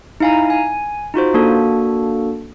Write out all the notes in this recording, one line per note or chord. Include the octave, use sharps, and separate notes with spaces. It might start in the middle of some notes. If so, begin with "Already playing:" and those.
D#4 E4 F5 G#5 A#5
G#5
D#4 F4 F#4 C5
A#3 D4 F#4 A4